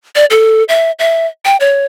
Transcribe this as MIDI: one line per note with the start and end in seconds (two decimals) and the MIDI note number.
0.16 0.25 74
0.30 0.63 69
0.69 0.91 76
0.99 1.27 76
1.45 1.56 79
1.60 1.86 73